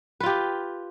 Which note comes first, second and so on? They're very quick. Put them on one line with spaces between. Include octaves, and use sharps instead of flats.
B4 F4 G4